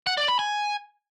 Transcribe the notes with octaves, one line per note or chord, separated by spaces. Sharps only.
F#5
D5
B5
G#5